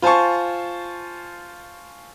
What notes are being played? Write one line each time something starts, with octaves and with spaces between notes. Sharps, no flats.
F4 C5 G#5 A5 C#6